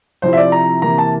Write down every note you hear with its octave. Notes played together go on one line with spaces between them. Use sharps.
C3 F3 C4 E4 C5
E5
D5
A#5
C3 E3 A#3 A#5
A5